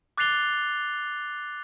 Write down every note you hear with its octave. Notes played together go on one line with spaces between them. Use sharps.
D6 F#6 A6 C7 F7 G7